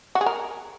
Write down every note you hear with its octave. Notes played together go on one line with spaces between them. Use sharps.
F#4
G#4
A#4